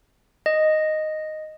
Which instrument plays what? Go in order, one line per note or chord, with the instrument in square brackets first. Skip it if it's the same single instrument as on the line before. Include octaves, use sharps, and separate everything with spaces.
[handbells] D#5